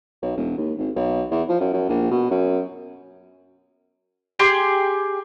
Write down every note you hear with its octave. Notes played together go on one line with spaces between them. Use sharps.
B1
E1
D#2
G#1
B1
E2
F3
F#2
F#2
A#1
B2
F#2
G4 G#4 G5 C6